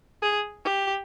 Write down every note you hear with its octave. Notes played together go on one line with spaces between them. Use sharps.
G#4
G4